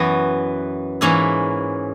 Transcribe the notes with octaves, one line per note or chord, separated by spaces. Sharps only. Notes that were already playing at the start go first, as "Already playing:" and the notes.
Already playing: F#2 E3 B3 F#4
G#2 E3 A#3 C#4 E4